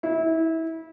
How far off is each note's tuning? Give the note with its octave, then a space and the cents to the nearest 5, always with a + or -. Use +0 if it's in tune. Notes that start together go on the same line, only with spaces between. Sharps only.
E4 -25